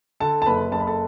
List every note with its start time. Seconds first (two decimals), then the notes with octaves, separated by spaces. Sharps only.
0.20 D3 A4 A5
0.42 A5
0.46 F#1 B4 B5
0.72 F#1 A5
0.80 B5
0.87 A4 A5